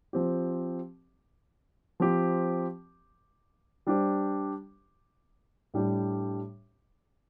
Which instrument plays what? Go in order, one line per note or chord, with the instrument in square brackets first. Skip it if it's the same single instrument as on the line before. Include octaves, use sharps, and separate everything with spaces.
[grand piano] F3 C4 G4
F3 C4 G4
G3 D4 G4 C5
A2 G3 D4 G4